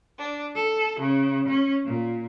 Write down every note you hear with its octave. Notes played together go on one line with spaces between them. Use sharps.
D4
A4
C#3
C#4
A#2